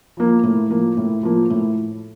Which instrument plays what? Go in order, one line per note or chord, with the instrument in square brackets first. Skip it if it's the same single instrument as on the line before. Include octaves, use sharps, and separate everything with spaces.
[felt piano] F3 A#3
A2
F3 A#3
A2
F3 A#3
A2